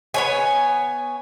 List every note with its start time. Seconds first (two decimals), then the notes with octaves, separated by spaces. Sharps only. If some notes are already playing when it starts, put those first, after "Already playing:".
0.14 B3 C#5 G#5